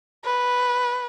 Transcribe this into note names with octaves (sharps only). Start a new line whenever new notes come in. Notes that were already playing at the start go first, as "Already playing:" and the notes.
B4